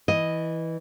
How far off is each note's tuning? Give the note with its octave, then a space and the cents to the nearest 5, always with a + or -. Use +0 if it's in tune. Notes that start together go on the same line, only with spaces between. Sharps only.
E3 -10 D#5 +0